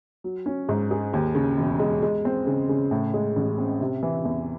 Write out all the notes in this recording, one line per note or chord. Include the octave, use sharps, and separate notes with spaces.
F#3
C#4
G#2
G#4
D#2
C#3
E1
G#3
G#3
C4
C#3
C#3
A2
G#3
A1
C4
C3
E3
E2